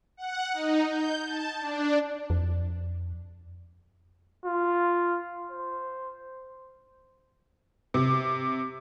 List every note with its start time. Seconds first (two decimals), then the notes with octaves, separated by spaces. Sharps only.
0.17 F#5
0.54 D#4
0.90 G6
1.26 A5
1.60 D4
2.30 F2
4.46 F4
5.52 C5
7.94 C3